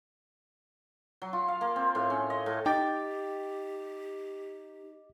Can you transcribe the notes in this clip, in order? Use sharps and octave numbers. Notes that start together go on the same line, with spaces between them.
F#3
F4
F5
A#3
C4
A2
C#4
D#5
A2
D#4 G4 D#5 G5 D6 A6